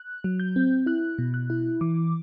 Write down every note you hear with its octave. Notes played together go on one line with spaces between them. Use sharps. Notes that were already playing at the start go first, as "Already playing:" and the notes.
Already playing: F#6
F#3
G6
C4
E4 F#6
B2
F#6
E4
E3 D6